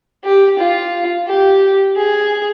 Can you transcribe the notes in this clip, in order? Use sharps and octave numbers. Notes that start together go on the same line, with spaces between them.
G4
F4
G4
G#4